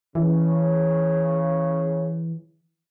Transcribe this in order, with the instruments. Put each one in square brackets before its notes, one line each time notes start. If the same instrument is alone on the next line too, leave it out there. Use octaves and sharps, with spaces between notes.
[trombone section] C#3 [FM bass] E3